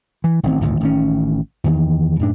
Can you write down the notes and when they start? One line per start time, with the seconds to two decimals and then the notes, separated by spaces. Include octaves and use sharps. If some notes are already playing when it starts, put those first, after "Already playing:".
0.24 E3
0.43 A1 D#3 G#3 C4
0.61 G#1 D2 A#2
0.80 A1 D#3 C#4
1.64 E2 D#3 E3
2.19 F#2 A2 A3 D4